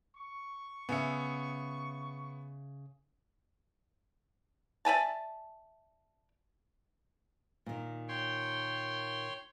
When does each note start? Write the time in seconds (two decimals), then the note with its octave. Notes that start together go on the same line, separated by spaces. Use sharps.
0.16 C#6
0.89 C#3 B3 E5 C#7
4.85 D5 E5 G#5 A5
7.66 A#2 D#3
8.08 C#5 G5 C6